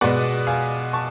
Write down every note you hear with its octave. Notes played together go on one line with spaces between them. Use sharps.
B2 G#3 B3 D5 F#5
F5 G#5
A5 C#6